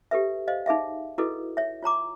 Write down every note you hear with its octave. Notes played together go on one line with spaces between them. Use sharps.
G4 A4 B4 E5
C5 D#5 F5
D#4 G#4 E5 F5
E4 F#4 G#4 A4 B4 D#5
C#5 E5
F4 C#5 A#5 D6